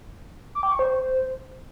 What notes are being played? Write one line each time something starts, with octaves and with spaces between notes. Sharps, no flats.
D6
G5
C#6
C5